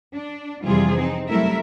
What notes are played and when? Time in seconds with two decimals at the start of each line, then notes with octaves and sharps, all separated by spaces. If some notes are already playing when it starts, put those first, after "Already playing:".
0.15 D4
0.64 F2 C3 E3 G3 F4 G#4
0.98 C4 D#4
1.29 F#3 G3 A3 E4 A#4 E5